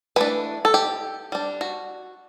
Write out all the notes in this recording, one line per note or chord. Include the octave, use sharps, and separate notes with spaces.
E3 A3 D4 B4
A4
G4
G3 D4
F#4